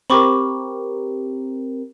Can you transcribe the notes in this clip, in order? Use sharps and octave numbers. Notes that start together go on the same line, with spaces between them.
C4 G4 A#4 B5 C#6 D6